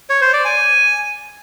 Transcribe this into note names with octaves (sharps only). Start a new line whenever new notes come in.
C#5
C5
D5
G#5